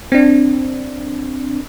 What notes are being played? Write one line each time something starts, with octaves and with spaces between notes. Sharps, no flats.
C4 D4